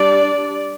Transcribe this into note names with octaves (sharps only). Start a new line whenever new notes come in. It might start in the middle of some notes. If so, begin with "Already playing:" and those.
Already playing: G3 D4 D5